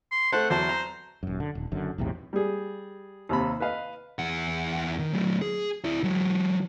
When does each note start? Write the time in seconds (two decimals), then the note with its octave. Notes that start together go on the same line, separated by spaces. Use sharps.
0.12 C6
0.32 A3 A4 C5 F#5
0.50 E2 F#3 C5 A5
0.69 A#5
1.23 D#1 F#2
1.40 D3
1.55 D#1
1.72 F#1 F#2 D3
1.98 B1 E2 A2 C3
2.33 G3 G#4
3.29 D#2 C3 D#4 B5
3.60 B4 D#5 F5
4.19 E2 F#5
4.99 D#3
5.13 F#3 A3
5.42 G#4
5.85 E4 D5
6.03 E3 F#3